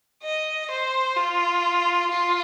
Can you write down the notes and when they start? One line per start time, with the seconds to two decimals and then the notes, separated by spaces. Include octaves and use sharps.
0.23 D#5
0.71 C5
1.17 F4
2.11 F4